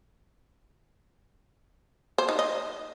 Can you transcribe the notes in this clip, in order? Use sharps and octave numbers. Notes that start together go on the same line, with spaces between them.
C5
D#4
D#5